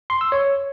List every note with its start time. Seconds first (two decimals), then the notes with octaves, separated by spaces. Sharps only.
0.10 C6
0.21 E6
0.32 C#5